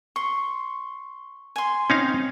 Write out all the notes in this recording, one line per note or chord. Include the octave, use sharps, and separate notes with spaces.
C6 C#6
G#5 C6
C4 C#4 D#4 F5